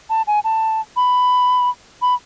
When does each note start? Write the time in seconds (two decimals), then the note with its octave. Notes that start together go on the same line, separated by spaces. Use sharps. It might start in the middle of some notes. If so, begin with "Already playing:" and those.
0.10 A5
0.27 G#5
0.44 A5
0.96 B5
2.02 B5